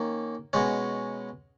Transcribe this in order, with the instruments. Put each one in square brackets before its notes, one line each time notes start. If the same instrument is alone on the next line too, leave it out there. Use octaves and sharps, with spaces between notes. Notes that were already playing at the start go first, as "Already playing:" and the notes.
Already playing: [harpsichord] D#3 A#3 C#4
B2 G#3 C#4